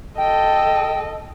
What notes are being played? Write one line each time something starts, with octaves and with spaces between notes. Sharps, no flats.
A4 D#5 G5